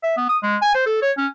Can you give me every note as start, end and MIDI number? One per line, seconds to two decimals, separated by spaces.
0.03 0.16 76
0.17 0.27 59
0.29 0.38 87
0.43 0.57 56
0.62 0.74 80
0.75 0.86 72
0.86 1.00 69
1.02 1.12 73
1.18 1.27 61